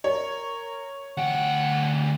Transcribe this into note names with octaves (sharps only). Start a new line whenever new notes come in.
A#4 C#5
D2 F#5 G5